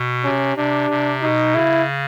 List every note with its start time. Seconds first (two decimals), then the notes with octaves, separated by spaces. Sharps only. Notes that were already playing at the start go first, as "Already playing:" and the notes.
Already playing: B2
0.24 C3 C#4
0.56 C3 D4
0.90 C3
1.22 B2 D#4
1.55 C#3 E4